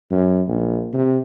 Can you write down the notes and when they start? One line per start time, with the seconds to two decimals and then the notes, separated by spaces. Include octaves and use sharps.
0.11 F#2
0.48 A#1
0.93 C3